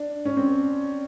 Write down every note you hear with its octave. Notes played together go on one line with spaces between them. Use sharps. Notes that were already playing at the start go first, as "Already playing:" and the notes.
Already playing: D4
C#4
C4